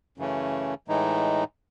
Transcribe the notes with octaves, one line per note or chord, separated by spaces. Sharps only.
F#2 C#3 E3 A3 C#4
A2 E3 G#3 D#4